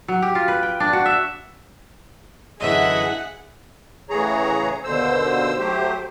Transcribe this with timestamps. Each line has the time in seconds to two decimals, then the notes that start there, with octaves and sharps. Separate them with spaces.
0.08 F#3
0.22 G4
0.35 F4
0.48 B4
0.63 G5
0.80 D4
0.93 F#4
1.06 E5
2.61 F#2 D3 E3 G#4 D#5 E5 F#5
4.10 A2 C#3 E3 G#4 C#5 A#5
4.84 D#2 B2 D3 C5 E6
5.59 F#3 A3 G4 C5